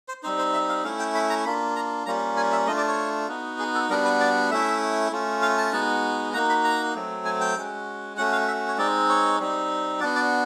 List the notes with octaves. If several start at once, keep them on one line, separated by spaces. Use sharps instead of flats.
C5
G3 C4 D#4 C5
C5
E5
F5
A3 C#4 E4 F5
G5
B5
A#5
A#3 D4 F4 B5
A#5
G3 A#3 C#4 F4 A#5
G#5
E5
A3 D4 F4 D#5
D5
C#5
B3 D#4 F#4
G#4
A4
G3 B3 D4 F#4 A#4
B4
D5
A3 C#4 E4 E5
A3 C#4 F4
F5
A5
G#3 B3 D#4 F#4
A#3 D#4 F#4 A#5
B5
A#5
F#3 A3 C4
G#5
G5
G#3 C#4 F#4
A3 C#4 F#4 F#5
F5
E5
C#5
G#3 C4 D#4 D5
C#5
G3 C4 D#4
B3 D4 F#4 D5
D5